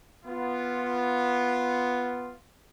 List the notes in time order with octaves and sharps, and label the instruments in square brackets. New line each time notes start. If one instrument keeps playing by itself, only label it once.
[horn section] B3 F4